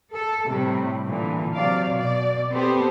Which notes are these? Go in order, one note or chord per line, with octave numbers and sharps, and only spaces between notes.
A4
A2 C3 G3
A#2 D3 E3
C3 F#3 D5 F5
B2 D5
B3 C4 G4 A4 C5